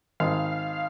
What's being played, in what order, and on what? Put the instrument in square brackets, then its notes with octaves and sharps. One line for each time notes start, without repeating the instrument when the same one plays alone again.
[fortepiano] G#1 [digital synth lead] F5